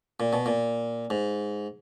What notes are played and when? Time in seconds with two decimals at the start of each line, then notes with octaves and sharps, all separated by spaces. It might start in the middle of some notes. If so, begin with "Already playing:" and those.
0.20 A#2
0.33 B2
0.46 A#2
1.10 G#2